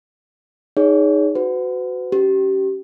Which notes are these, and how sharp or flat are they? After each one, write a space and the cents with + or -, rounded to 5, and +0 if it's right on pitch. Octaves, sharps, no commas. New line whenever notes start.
D#4 +0 G#4 +0 C#5 +30
F#4 +0 B4 +40
C#4 +0 G4 -30